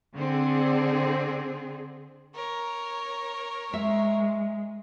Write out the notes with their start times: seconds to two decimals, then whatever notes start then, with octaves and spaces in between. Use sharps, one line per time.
0.15 D3 C4 G#4
2.34 A#4 C#5
3.73 G#3 E5